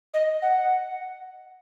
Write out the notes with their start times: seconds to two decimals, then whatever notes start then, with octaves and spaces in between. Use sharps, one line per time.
0.13 D#5
0.42 F#5